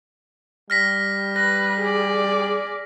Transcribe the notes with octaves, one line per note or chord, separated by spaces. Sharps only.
G3 F6 A#6 B6
B4 A#6
G#4 D5